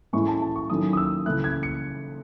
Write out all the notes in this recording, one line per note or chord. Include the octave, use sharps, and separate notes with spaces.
A2 E3 G#3 C#4 E4 C#6
A5
A5
C#6
D#3 F#3 A3 C#4 E4 D#6
D#6
E6
C#3 E3 A3 E4 F#6
G#6
C#7